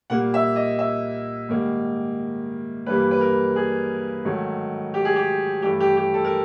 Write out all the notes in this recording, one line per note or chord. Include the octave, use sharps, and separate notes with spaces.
A#2 G3 A#3 F#5
E5
D#5
E5
G#2 D#3 G3 A#3
G2 E3 G3 A#3 B4
B4
A#4
G#4
G#2 D#3 F#3 A3
G4
G#4
G4
G2 E3 A3 G4
G4
G4
A4
A#4